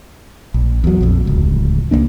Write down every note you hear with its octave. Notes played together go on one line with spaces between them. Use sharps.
A#1
E2 F#3
A#1 F2
D1 C#2
C#2 A#2 A#3 D4